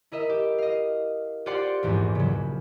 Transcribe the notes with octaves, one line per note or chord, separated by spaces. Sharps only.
E4 A#4 D#5 E5
G4
D#5 F5
F4 G4 C5 D5 F#5 C6
A#1 E2 G#2 G#3
C#3 F#3